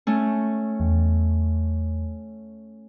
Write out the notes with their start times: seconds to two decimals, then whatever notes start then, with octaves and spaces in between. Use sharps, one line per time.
0.07 A3 C#4
0.80 E2